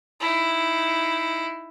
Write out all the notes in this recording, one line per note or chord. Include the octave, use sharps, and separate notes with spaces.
D#4 E4